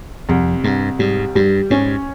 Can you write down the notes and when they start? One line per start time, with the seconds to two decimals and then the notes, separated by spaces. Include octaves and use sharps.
0.29 C2 F2
0.64 C2 G2
0.99 G#2 G3
1.35 G2 G3
1.70 G#2 C#4